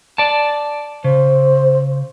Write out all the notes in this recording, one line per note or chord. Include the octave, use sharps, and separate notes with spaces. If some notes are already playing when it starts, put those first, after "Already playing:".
D5 A5
C#3 C5